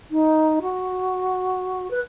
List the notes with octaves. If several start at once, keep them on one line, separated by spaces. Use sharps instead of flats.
D#4
F#4
B4